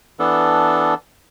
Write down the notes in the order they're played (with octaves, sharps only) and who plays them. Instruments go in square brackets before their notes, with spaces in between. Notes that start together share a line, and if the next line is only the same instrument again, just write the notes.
[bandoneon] E3 B3 D4 A4